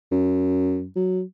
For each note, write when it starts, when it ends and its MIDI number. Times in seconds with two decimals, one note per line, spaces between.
0.12 0.87 42
0.96 1.22 54